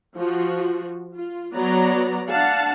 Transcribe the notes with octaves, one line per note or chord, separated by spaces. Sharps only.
F3 F#4
F4
F#3 B3 D5 A#5
D4 F5 F#5 A5